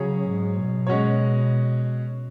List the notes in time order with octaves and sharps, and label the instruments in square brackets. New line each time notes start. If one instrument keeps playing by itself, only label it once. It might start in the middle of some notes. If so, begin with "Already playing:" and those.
Already playing: [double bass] C#3 [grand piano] F#3 C#4 G#4 C#5
[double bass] G#2
B2
[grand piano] G#3 C#4 F#4 C#5